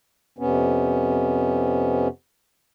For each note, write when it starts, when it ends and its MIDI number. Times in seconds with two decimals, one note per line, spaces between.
0.39 2.08 41
0.39 2.08 48
0.39 2.08 59
0.39 2.08 61